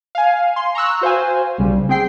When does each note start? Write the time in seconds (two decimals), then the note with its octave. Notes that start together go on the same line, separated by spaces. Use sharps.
0.15 F5 G#5
0.56 C6
0.75 A#5 C#6 E6 F#6
1.01 F#4 C5 F5 G#5
1.58 B1 C#3 G3
1.89 C4 G#4 G5 C7